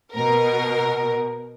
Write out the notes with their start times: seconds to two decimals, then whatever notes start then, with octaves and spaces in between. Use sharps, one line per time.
0.13 B2 A#4